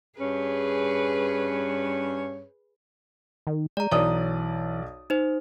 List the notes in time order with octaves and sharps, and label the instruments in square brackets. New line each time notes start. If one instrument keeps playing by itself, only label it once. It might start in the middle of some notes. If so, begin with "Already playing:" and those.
[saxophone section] G2 C#4 C#5 [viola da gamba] G#4 B4
[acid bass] D#3
[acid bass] G#3 [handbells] D5 A#5
[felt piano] B1 D5 D#6 [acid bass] E3 [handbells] C#5
[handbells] D#4 C5